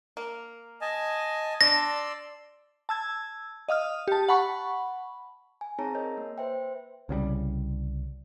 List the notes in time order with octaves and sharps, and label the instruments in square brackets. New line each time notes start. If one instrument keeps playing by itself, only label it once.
[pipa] A#3
[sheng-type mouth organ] D#5 G#5 A5
[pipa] D4 [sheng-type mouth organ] D5 C6 E6 [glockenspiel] A#6
[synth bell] A5 E6 G#6
D#5 F5 D#6 F6
G4 A5
F#5 A5 B5 C#6
[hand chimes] G#5
C4 D#4 G#4 C#5 A5 A#5
A#4 C#5 D#5 G6
A#3
B4 C5 E5 G5
[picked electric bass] C2 C#3 F#3 G3